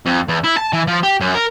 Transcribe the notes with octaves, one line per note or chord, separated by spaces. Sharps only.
F2
E2
E4
A5
E3
F3
G4
F#2
A#4